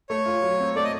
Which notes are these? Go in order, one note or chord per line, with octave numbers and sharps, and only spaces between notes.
A3 C#5
F4
F#3
C4
A3 D5
D#5